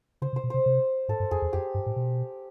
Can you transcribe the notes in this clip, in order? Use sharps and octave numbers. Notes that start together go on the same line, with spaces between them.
C#3 C5
C3
C5
B2
C3 C5
C3
G#2 A4
G2
F2 G#4
E2
F2 G4
G2
A2
B2